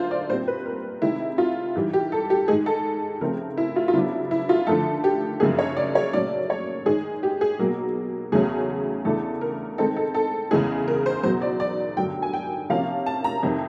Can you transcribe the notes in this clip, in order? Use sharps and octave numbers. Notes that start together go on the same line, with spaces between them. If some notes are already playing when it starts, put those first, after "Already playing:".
Already playing: F#2 D3 F4 C5
D5
A#2 G3 C4 C5
B4
A#4
C3 D#3 G#3 C4 E4
F4
G#2 E3 G3
G4
A4
G4
G#2 D#3 G#3 G#4
A4
C#3 F3 A3 C4 A#4
E4
F4
F4
C#3 F#3 B3 D4 E4
E4
F4
D3 F3 A3 A4
G4
F#2 C#3 F3 A#3 D#4 G#4
C#5
D5
C#5
A#2 F#3 A3 C#4 D5
C#5
G#2 D#3 G#3 G#4
G4
G#4
B2 F#3 A#3
E2 C#3 F#3 A3 C#4 G#4
E2 C#3 E3 A3 D4 A4
A#4
D#3 G#3 C4 D#4 A4
A4
A4
E2 C#3 E3 G#3 G#4
A#4
C5
E2 B2 F#3 C5
D5
D5
G2 D3 F#3 G5
G#5
G5
C3 F3 A#3 C#4 F5
A5
A#5
F2 C3 D#3